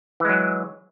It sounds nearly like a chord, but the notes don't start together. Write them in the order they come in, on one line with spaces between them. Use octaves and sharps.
E3 G#3 F#3